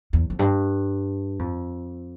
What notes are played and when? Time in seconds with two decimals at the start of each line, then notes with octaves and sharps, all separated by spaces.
0.13 E2
0.30 F2
0.39 G2
1.39 F2